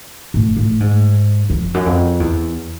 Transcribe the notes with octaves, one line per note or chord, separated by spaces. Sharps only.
A2
A2
G#2
F2
F#2
F2
E2